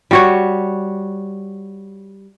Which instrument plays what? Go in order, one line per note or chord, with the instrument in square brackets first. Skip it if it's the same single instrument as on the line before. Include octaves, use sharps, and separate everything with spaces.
[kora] G3 F#4 C#5